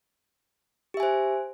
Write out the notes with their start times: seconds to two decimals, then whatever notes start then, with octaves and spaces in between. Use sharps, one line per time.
0.94 G4
0.97 E5
1.00 G#5
1.03 C5